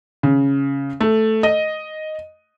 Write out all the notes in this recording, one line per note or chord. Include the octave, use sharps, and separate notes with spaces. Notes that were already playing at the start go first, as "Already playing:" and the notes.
C#3
A3
D#5